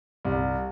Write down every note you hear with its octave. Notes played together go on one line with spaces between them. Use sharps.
C2